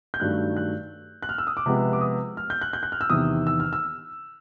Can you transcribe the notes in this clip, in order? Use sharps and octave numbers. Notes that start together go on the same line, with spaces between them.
G6
G2 D#3 F#3 A3 F#6
F#6
F#6
F6
E6
D#6
D6
C3 F3 G#3 B3
D6
D#6
F6
G6
F#6
G6
F#6
F6
E6
E2 C3 D#3 D#6
E6
F6
E6